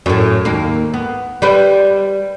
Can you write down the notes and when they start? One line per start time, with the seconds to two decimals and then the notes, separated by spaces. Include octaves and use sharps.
0.06 F#2 A2
0.45 D#2 A#3
0.94 B3
1.42 G3 B4 C5